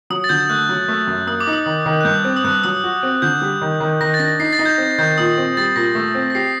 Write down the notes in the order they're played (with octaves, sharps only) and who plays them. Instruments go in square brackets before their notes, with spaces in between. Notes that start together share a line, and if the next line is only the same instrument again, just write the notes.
[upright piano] F#3 [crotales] D#6
[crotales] A6
[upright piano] D3 [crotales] G6
[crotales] G6
[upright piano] A3 [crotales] F#6
[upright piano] F#3
A3
F#2
[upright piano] A#3 [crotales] D#6
[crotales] D6
[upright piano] D#4
[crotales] D#6
[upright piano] D#3
D#3
[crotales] F#6
[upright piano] G2 [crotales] G6
[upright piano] C4
[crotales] D#6
[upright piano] G2 [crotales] F#6
[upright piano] F#3 [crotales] D#6
[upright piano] F#4
C4
[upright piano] D3 [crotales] G6
[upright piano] G3
D#3
D#3
[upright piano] D#3 [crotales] A#6
[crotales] A6
[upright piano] D4 [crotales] A#6
[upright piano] D#4 [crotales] C7
[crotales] A6
[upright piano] D#4
[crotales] G6
[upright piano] C4
[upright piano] D#3 [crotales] G6
[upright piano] A#2 [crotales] D#6
[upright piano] C4
[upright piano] G3 [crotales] A6
[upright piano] A#2 [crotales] A#6
[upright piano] A3
C4
[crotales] A#6
[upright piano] G4 [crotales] C7